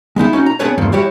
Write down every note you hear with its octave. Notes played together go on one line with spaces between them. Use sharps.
G#3 B3 D#4 E4
C#4 D#4 F#4
A#5
B3 C4 D4 G#4 B4 C#5
E2 G2 F3 A3 A#3
G3 E4 F#4 G4 C#5